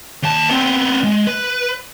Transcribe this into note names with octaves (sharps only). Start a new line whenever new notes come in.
D#2 A5
B3 C4
G#3
B4